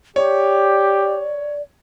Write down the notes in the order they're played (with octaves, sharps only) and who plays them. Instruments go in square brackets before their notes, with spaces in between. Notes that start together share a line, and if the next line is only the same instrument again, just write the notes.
[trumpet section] G4 [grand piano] C#5 [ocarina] D5